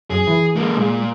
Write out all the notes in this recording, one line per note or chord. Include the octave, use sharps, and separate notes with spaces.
F#2 G#4
E3
G#3 A#3
A#2 G#3